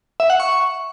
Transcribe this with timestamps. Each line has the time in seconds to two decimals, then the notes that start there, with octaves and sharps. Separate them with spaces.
0.20 E5
0.30 F#5
0.40 C#6